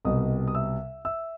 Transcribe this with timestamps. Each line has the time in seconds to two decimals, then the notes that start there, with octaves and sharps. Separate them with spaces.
0.05 C2 B2 G3 D#5 D#6
0.48 D#6
0.55 E5 E6
1.05 E5 E6